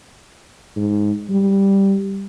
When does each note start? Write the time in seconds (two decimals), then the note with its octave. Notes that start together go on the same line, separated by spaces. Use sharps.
0.76 G#2
1.30 G3